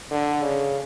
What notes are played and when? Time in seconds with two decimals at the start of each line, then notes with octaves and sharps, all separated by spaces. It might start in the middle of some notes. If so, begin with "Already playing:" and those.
0.11 D3
0.43 C#3